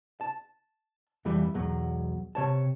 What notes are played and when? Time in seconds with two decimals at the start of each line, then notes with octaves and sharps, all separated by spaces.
0.21 A5
1.25 F2 E3 G3
1.54 B1 E2 F#3
2.35 C3 C#5 A5